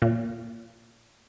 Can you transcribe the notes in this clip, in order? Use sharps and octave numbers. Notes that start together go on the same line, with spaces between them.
A#2